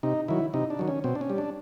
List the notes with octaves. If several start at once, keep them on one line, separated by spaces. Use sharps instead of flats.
C3 D#4
D#3 F#3 E4
C3 D#4
D4
D#3 F#3
C#4
B2 C4
D4
C#4
G3
D4